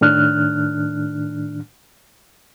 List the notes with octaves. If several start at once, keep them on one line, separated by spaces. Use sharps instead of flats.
A2 D#3 D4 F6 F#6